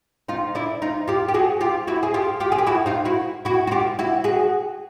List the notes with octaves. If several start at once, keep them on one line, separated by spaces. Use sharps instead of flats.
D#4 F4
D4 E4
D#4 F4
F4 G4
G4
F#4 G#4
F4 G4
E4 F#4
G#4
F4 G4
F4 G4
G#4
G4
E4 F#4
D#4 F4
E4 F#4
E4 F#4
F#4
F4 G4
E4 F#4
F#4 G#4